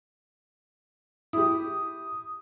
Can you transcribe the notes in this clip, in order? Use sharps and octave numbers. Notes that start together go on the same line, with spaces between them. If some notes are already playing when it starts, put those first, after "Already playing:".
E4 G4 D#6